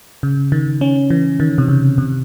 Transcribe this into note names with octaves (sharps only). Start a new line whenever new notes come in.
C#3
D#3
C#4
E3
D#3
C3
C#3
C3